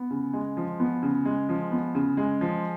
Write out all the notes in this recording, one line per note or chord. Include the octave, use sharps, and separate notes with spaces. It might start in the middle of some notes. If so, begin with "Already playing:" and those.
Already playing: B3
C#3
G#3
F3
B3
C#3
G#3
F3
B3
C#3
G#3
F3